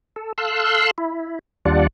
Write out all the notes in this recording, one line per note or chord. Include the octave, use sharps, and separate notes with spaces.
A4
A4 F5 C6 E6 F#6
E4
D#2 G3 D4 F4 D5 F#5